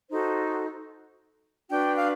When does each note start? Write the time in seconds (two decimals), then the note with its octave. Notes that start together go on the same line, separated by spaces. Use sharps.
0.10 D#4 F#4 A4 C5
1.68 D4 F#4 B4 G5
1.97 F5